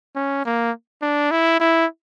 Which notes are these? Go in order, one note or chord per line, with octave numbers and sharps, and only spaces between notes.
C#4
A#3
D4
E4
E4